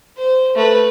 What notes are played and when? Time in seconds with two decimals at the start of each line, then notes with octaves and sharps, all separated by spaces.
0.17 C5
0.55 A3 B4